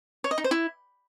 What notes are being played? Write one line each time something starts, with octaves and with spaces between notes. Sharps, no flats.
C#5
D#5
D#4
C5
E4